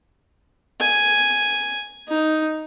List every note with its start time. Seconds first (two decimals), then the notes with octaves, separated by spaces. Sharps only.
0.80 G#5
2.08 D#4